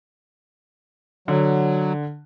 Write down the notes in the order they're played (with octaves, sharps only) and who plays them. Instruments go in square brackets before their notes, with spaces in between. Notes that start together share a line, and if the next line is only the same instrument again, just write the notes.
[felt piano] D3 [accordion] F#3